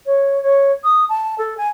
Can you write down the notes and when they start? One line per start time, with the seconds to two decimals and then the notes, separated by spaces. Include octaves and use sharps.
0.06 C#5
0.42 C#5
0.84 D#6
1.09 A5
1.38 A4
1.57 G#5